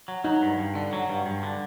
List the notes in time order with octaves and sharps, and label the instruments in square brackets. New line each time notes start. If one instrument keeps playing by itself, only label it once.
[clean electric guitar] F#3
[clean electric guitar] F#3 [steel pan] D#4
[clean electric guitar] G2
G2
D3
F#3
G2
G2
D3